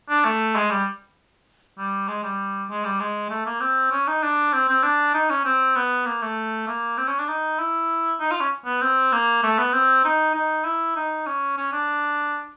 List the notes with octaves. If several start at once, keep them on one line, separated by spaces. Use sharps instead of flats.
D4
A3
G#3
G3
G3
G#3
G3
G#3
G3
G#3
A3
A#3
C4
C#4
D#4
D4
C4
C4
D4
D#4
C#4
C4
B3
A#3
A3
A#3
C4
C#4
D4
D#4
E4
D#4
F4
C#4
B3
C4
A#3
A3
B3
C4
D#4
D#4
E4
D#4
C#4
C#4
D4